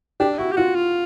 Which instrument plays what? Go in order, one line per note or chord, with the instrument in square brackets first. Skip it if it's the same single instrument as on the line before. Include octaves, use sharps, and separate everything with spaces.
[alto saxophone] D4 [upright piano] G4
[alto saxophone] E4 [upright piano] F#4
[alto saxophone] G4
[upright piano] F4 [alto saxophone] F#4
[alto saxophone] F4